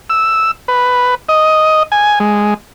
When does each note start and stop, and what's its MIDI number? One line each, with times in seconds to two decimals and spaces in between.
0.10 0.51 88
0.68 1.15 71
1.29 1.83 75
1.92 2.19 80
2.20 2.54 56